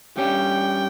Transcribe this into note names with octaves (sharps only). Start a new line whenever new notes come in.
G2 G3 C#4 G4 G5